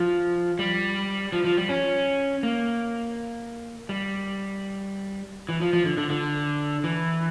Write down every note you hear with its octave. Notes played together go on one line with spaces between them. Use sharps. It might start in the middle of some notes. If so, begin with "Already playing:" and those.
Already playing: F3
G3
F3
F3
G3
C#4
A#3
G3
E3
F3
F3
D3
D3
D3
E3